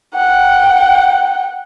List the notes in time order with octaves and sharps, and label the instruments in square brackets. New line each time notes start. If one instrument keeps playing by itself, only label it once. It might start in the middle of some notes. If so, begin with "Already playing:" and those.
[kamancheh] F#5 G5